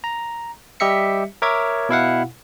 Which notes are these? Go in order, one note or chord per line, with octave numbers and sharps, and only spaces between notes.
A#5
G3 G4 D#5 E5 B6 C#7
A#4 C#5 E5 D6 G#6
B2 E4 F5 F#5